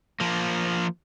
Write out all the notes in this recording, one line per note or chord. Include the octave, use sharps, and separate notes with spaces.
F3 A#3